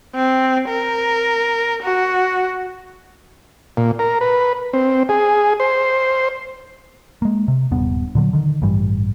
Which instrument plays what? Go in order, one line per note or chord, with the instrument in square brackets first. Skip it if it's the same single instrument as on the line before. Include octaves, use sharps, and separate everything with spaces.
[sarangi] C4
A#4
F#4
[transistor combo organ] A#2
A#4
B4
C4
G#4
C5
[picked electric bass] G#3 A#3
C3
D#1 G2 B3
A#2 D3 F#3
D3 D#3
A1 G2 E3 G3